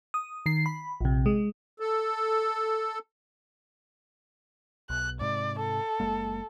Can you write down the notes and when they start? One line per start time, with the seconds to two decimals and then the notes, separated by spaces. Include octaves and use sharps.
0.14 D#6
0.46 D#3 C7
0.66 B5
1.01 A#1 C3
1.26 G#3
1.80 A4
4.90 B1 F#6
5.21 G#2 C3 D5
5.59 A4
6.00 F#1 G#3 A#3